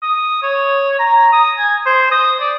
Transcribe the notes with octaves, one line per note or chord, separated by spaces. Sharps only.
D#6
C#5
A#5
D#6
G#5
C5
D#6
D5